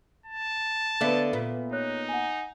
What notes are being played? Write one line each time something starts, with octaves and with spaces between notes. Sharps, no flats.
A5
D3 B3 B4 E5 F5
A#2 B3
D#4 C#5 F#6
F#5 G#5